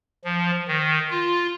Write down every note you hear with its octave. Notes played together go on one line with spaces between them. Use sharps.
F3
D#3
F4